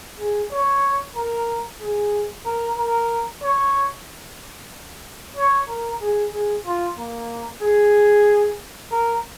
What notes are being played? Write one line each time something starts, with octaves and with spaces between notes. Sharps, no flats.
G#4
C#5
A#4
G#4
A#4
A#4
C#5
C#5
A#4
G#4
G#4
F4
A#3
G#4
A#4